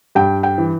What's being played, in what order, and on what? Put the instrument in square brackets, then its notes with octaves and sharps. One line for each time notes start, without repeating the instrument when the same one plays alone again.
[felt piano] G2 G5
G5
E3